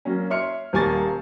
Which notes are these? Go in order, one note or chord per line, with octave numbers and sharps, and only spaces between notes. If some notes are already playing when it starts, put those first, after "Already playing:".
F#3 A#3 C#4
C#5 E5 C6 F6 C#7
D#1 G3 A#3 G#5 C#6 A6